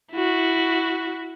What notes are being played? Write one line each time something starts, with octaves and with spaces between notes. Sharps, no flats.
E4 F#4